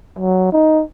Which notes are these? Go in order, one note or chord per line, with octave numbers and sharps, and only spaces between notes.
F#3
D#4